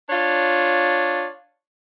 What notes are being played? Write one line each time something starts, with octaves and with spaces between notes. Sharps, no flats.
D4 F4 C#5